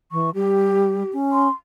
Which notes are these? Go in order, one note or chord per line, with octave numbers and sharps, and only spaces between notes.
E3 C#6
G3 G4
C#4
C6